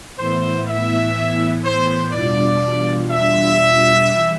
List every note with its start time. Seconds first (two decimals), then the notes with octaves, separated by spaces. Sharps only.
0.17 A2 E3 B3 E4 C5
0.66 E5
1.64 C5
2.12 E2 B2 G3 D4 F4 D5
3.10 E5
4.08 E3 G3